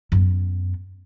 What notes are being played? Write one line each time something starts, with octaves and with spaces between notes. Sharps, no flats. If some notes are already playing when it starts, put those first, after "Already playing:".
F#2 B3